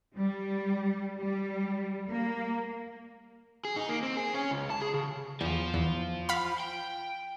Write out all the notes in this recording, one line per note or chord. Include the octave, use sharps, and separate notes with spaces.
G3
G3
A#3
G#4
D#4
A#3
C4
G#4
C#4
C#2
A5
G#4
C#3
E2 F3 F4
E2
F5 B5
G5